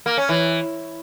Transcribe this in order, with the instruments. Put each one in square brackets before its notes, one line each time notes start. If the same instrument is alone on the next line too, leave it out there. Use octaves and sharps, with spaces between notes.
[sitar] A#3
C#4
E3